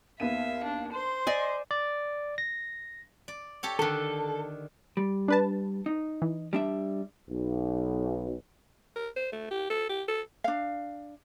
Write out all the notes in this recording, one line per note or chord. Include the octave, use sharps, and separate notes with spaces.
D#2 B3 E5 F5 D#7
D4
C5 C6
D5 D#5 G#5
D5
A#6
D5
G4 A4 C#5
D3 D#3 A4
G3
D4 B4 A5
D#4
E3
G3 D4 E5
B1
A#4
C5
A3
G4
A4
G4
A4
D4 F5